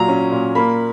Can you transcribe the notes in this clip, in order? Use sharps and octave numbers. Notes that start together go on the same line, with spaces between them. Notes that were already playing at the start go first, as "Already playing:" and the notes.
Already playing: A#2 F#3 A#5
C#4
A#2
A#3 B5